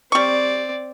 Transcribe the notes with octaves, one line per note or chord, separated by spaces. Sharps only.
G3 C4 D5 C#6